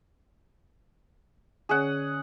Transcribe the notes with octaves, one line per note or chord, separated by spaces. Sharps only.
D3 C#4 G#4 C#5 F#5